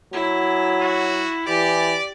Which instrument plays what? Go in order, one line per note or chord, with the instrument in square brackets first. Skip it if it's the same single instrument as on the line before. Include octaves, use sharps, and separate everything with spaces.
[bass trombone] F#3 [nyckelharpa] E4
[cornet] F#4
[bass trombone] E3 [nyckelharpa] G4 [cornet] D5